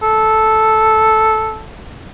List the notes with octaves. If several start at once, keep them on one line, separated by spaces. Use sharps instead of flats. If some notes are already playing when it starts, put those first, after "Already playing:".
A4